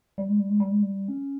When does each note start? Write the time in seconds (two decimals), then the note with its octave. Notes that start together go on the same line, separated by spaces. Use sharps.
0.18 G3
0.29 G#3
0.39 G3
0.49 G#3
0.60 G3
0.71 G#3
0.82 G3
1.08 C#4